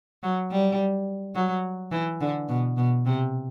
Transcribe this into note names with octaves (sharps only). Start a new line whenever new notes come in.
F#3
G3
F#3
E3
D3
B2
B2
C3